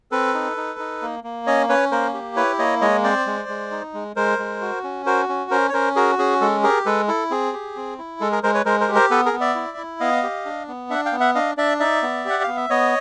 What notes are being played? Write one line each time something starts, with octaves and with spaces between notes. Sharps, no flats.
C4 A4 B4
D#4
D#4
D#4
A#3
A#3
C#4 C#5 D#5
C#4 B4 C#5
A#3 A#4 C5
G4
E4 B4 C#5
A#3 C#5 D#5
G#3 C#5 D#5
C4 C5 D5
G#3
G#3
D#4
G#3
G#3 A#4 C5
G#3
F#4
C#4
F#4 A#4 C5
C#4
C#4 A#4 C5
C#5
C#4 A#4 C5
F#4 G#4 A#4
C#4 G#4
G#3 A4
G4 G#4 A#4
G#3 A4 B4
E4 A4
C4 G#4
G4
C4
E4
G#3 A4
G#4 A#4
G#3 A#4 C5
B4 C#5
G#3 A#4 C5
A#4 C5
G4
A#4 C5
B3 A4 B4
G#4 A#4
B3
D5 E5
E4
E4
B3 D#5 F5
G4
D4
B3
D4 E5 F#5
F5 G5
B3
E5 F#5
D4 D#5 F5
D4 D5 E5
D#4 D5 E5
B3
G4 F#5
B3 F5
E5
B3 C#5 D#5